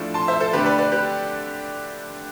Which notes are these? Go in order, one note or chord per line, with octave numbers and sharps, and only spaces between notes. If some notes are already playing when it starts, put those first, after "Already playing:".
Already playing: A2 F3 A3 D4
A5 C6
C5 E5
A4 C5
D3 A3 D4 G4 B4
B4 D5
B4 D5
G4 B4